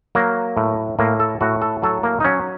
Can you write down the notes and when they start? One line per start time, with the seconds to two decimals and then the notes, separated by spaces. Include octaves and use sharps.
0.15 F#3 A#3
0.57 A2
0.99 A2 A#3
1.20 A4
1.41 A2 F#4
1.62 A4
1.82 F#3 A4
2.03 A#3
2.20 D#4
2.24 F#3 C#4